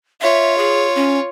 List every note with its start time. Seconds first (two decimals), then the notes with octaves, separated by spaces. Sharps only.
0.21 F4 C#5 E5
0.58 G#4
0.95 C#4